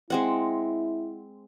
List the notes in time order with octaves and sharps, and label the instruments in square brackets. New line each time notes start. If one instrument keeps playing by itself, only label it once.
[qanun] G#3 C4 F#5 [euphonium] E4